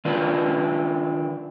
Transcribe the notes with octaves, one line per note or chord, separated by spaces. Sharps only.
D#3 D4 F4 B4